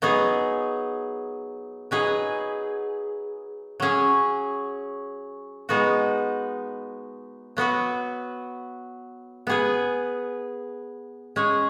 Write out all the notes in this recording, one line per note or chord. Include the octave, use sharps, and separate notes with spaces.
F#3 B3 D#4 G#4
F#3 D#4 G#4 B4
F#3 C#4 G#4
G#3 B3 D#4 F#4
F#3 B3 F#4 B4
B3 G#4 B4
G#3 C#4 G#4 C#5